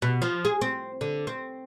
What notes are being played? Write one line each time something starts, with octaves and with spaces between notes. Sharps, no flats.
B2
F3
G#4
C4
D3
C4